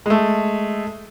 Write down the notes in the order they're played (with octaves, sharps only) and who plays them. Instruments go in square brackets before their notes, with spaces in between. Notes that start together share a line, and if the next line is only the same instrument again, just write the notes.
[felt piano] G#3 A3